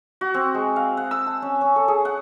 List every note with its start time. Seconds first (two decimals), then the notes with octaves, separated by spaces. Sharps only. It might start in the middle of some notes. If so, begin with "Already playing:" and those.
0.21 F#4
0.34 C4
0.54 G#3
0.76 F5
0.97 F#5
1.11 E6
1.26 A5
1.42 C#4
1.61 C#4
1.76 A4
1.88 G#4
2.05 F#5